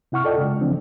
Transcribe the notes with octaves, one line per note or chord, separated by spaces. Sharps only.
C3 E4 F#5 C#6 F6
F4 A4 D5 D#5 G5
C#3 G#3
C#3 E3 F3 A3 C4 D4